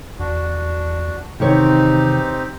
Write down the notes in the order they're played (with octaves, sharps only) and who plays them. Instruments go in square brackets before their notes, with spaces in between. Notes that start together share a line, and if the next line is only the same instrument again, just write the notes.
[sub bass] E2 [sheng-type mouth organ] D4 F#4
[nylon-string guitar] E2 D#3 C#5 [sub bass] C3 [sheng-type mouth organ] C4 D#4 G4